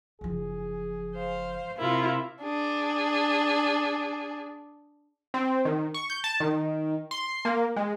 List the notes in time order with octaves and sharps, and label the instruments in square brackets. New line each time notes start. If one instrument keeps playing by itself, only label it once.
[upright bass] F#1 F3 [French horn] G#4
[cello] C5 F5
[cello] C3 [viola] E4 F4 [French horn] A#4
[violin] D4 G#4
[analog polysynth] C4
D#3
C#6
G6
A5
D#3
C6
A#3
G#3